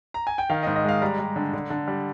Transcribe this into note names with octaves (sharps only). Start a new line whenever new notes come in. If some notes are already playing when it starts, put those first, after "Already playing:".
A#5
G#5
G5
D#3 F5
D#5
G#2
D#5
G#3 F5
G3 A#5
G3
D3
D3
D3
G3